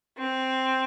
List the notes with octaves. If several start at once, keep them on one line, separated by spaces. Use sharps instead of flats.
C4